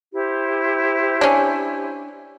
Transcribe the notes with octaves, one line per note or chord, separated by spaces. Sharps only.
E4 G4 C5
C#4 D4